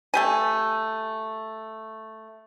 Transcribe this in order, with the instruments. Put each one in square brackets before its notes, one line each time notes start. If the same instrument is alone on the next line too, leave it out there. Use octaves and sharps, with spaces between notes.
[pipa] A3 G4 G#5